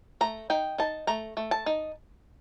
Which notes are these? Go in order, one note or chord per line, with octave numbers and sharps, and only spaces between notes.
A3 A#5
D#4 G5
D#4 A5
A3 A#5
A3
A5
D#4